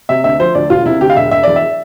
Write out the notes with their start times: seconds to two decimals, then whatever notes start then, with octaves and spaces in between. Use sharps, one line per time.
0.09 C3 E5
0.24 D2 E5
0.39 F3 C5
0.55 D2 D5
0.70 E1 F4
0.86 C3 E4
1.00 D2 G4
1.10 F5
1.16 E1 E5
1.31 E1 E5
1.43 E2 D5
1.56 E5